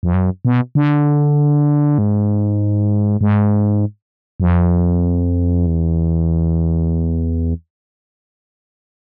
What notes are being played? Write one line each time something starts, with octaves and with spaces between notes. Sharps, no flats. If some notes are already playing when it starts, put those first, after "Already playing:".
F2
F#2
B2
D3
G#2
G#2
F#2
F2
E2